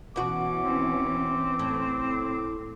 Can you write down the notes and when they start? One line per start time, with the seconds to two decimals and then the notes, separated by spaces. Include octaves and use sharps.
0.16 B2 E3 C#4 F#4 D6
0.63 C4
1.59 A2